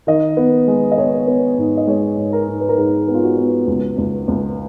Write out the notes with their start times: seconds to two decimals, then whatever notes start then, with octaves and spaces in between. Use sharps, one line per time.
0.07 D#3 D#5
0.37 B3
0.68 G#3
0.92 D#5
0.98 B3 C#5
1.27 B3
1.58 G#2
1.77 D#5
1.87 G#3 C#5
2.17 G#2
2.33 A#4
2.47 G#2
2.60 B4
2.69 A#4
2.78 G#2 G#4
3.08 B3
3.14 F4
3.23 F#4
3.38 B3
3.67 C#2
3.98 C#2
4.28 C#2